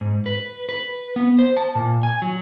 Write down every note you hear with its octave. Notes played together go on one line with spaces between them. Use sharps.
G#2
B4
B4
B3
C5
A5
A#2
G#5
F#3